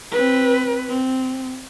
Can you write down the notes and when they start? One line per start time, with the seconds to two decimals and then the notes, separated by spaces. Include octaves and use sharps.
0.11 C4 B4
0.89 C4